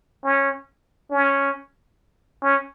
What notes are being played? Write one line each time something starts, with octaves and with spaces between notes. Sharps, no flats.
C#4
C#4
C#4